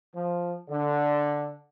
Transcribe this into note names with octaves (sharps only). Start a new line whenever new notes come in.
F3
D3